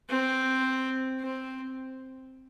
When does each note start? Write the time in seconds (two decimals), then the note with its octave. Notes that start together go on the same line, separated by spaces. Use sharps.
0.09 C4
1.20 C4